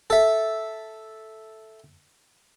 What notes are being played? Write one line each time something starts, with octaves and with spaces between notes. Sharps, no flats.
A4 E5